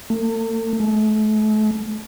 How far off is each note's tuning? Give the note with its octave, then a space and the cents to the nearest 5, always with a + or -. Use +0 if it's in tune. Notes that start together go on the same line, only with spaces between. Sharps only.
A3 +45
A3 -40